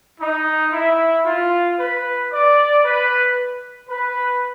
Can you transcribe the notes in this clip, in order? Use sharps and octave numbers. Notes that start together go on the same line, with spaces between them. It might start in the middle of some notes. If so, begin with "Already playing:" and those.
D#4
E4
F4
B4
D5
B4
B4